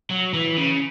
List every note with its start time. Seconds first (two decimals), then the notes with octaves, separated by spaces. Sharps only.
0.10 F#3
0.34 E3
0.58 C#3